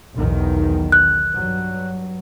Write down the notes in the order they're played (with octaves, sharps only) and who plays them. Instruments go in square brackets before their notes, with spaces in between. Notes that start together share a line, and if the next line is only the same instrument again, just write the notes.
[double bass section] B1 E2 D#3
[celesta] F#6
[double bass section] G2 F#3